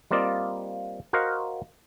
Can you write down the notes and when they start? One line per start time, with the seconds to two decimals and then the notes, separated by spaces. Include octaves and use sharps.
0.11 G3 A#3 C4 F4 D5 D#5
1.13 F#4 A#4 C5 D#5 F5 F#5